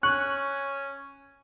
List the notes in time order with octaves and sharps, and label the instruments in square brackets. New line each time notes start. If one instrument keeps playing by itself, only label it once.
[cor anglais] C#4 [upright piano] C#6 [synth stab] F#6